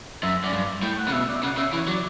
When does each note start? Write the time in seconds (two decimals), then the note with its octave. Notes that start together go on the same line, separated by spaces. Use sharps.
0.23 F#2 E5
0.44 F#2 D5
0.53 G2
0.83 A2 G5
0.99 F#5
1.08 C#3
1.12 B2 E5
1.28 D5
1.36 E5
1.43 C#3 F#5
1.57 C#3 E5
1.73 E3
1.78 C#5
1.88 F#3 D5